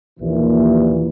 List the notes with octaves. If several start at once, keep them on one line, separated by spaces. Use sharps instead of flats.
A#1 D#2 A#2 E3